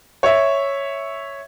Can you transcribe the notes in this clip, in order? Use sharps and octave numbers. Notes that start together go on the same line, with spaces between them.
C#5 E5